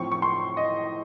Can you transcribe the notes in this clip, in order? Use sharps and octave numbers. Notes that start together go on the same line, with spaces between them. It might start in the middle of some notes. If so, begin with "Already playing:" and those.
Already playing: A2 F3 C4 C#6
C#6
C6
D#5